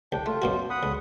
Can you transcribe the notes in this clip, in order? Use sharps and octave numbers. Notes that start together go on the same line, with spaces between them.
C2 D4 G5
A3 F4
F#2 B2 F#4
F#5 B5 D#6
C#2